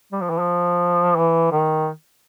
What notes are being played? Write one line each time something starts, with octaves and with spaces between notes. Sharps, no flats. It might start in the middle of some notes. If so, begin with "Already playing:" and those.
G3
F3
E3
F3
E3
D#3